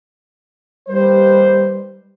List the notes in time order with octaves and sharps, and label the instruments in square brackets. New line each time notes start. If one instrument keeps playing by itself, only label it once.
[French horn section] D#2 B4 C5 [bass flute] G3